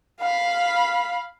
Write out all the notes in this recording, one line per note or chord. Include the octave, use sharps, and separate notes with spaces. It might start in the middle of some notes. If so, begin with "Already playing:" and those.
F5 B5